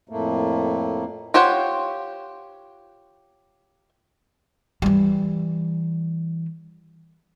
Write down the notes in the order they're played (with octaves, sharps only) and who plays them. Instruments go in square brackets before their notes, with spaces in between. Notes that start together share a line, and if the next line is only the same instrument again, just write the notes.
[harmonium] F2 A2 A3 A#3
[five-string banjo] F4 G4 C5 C#5 F#5
[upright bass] E3 G3